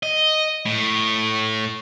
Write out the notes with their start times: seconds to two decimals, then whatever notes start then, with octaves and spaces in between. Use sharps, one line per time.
0.03 D#5
0.66 A2